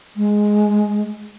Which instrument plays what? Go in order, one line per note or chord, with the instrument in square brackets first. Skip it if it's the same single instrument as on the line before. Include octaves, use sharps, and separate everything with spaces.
[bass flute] G#3